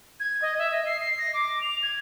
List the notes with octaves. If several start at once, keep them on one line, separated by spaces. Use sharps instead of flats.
G#6
D#5
E5
D#5
C7
C7
A#6
D6
F7
G#6